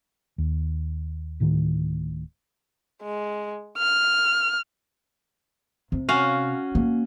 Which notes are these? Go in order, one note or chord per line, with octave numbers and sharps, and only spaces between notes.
D#2
D1 A2 D#3
G#3
F6
C3
C#4 F#4 F5
A#3